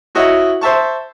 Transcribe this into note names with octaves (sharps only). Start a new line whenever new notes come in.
E4 F#4 C#5 D#5 E5
C5 E5 A5 C#6